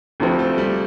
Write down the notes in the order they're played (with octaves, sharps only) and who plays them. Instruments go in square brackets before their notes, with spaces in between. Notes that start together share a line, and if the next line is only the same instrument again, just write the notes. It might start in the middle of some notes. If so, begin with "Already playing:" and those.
[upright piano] D2 C3 F3 C4
[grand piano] A3
G3